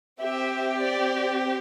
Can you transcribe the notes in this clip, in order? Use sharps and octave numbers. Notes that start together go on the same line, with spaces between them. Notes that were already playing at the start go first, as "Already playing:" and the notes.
C4 G4 E5
D5